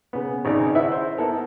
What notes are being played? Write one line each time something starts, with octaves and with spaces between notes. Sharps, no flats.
C#3 B3
G#1 C#3 D#4 D5
E4 B4 E5 F#5
C5
B3 E4 A4 A#4